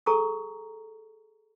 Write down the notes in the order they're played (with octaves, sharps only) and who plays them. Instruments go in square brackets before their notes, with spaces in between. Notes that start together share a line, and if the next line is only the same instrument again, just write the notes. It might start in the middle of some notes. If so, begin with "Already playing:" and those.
[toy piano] G#4 A4 G#5 A#5 C#6 D#6